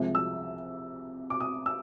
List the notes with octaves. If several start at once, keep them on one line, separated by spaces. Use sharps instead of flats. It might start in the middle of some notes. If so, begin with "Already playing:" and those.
Already playing: C2 C3 F3 G#3
E6
D6
D#6
E6